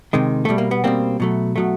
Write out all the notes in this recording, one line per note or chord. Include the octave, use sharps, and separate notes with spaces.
C3 D#3 G#3
B2 G3 A3
A#3
B3
B2 G3 A#3 C4
B2 F#3 A3
B2 F#3 A3